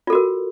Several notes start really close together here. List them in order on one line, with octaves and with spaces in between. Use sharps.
F4 A4 F#4 A#4